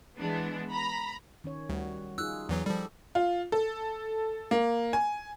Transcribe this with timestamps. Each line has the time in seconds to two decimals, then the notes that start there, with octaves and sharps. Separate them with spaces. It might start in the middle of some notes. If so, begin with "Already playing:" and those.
0.18 E3 G#3 B3 D4
0.70 A#5 B5
1.44 D#3 C#4 C#5
1.69 D2 G3 F#4
2.18 D#4 F4 G#4 E6 F#6
2.49 E2 E3 F#3
2.66 F3 G3 G4 A4
3.15 F4
3.52 A4
4.51 A#3
4.93 G#5